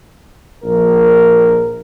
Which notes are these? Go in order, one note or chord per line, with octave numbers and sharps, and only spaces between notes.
A#1 A#4